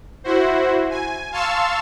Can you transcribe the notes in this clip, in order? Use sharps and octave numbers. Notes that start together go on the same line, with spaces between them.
E4 F#4 C5
G#5
F5 A5 C6 C#6 E6